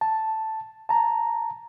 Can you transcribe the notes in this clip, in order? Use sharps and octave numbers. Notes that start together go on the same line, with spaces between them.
A5
A5 A#5